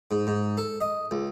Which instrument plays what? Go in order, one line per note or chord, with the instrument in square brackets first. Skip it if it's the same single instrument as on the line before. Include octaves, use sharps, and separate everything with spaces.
[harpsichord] G#2
G#2
A4
D#5
C#2